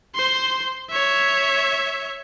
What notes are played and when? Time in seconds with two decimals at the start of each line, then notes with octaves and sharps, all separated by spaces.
0.16 C5 C6
0.90 C#5 E5